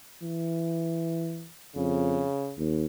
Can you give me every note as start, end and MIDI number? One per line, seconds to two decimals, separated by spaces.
0.23 1.48 52
1.76 2.25 41
1.76 2.55 49
2.58 2.85 39